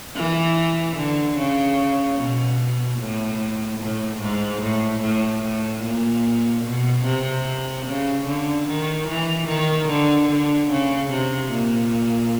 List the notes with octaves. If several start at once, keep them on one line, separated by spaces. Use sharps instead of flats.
E3
D3
C#3
B2
A2
A2
G#2
A2
A2
A2
A#2
B2
C3
C#3
D3
D#3
E3
D#3
D3
D3
C#3
C3
A#2